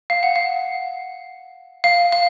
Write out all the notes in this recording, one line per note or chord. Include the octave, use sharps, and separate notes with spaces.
F5
F#5
F5
F5
F5